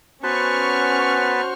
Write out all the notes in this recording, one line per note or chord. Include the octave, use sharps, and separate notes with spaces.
B3 C#4 F#4 B4 C5 A5 C#6 F6